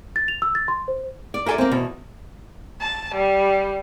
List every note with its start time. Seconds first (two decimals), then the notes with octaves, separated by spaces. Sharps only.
0.16 A6
0.28 F7
0.42 E6
0.55 A6
0.68 C6
0.88 C5
1.34 D5
1.46 F#4 A4 A#4 D5 E5 G#5
1.58 A#3 C4
1.71 E2 B2
2.81 A5
3.15 G3